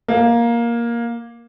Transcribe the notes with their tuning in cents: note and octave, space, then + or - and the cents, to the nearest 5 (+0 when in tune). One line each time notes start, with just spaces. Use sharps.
A#3 +10